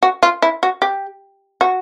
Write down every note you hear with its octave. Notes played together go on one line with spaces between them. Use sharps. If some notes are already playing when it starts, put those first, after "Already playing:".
F#4
F4
E4
F#4
G4
F#4